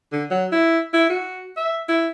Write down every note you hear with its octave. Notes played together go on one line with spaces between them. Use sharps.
D3
F#3
E4
E4
F#4
E5
E4